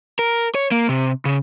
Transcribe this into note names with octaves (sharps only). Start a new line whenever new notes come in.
A#4
C#5
A#3
C3
C#3